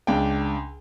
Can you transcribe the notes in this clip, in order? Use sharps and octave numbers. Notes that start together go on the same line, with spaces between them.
C#2 D4 G5